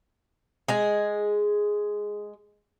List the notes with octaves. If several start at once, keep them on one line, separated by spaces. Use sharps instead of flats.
G#3 G#4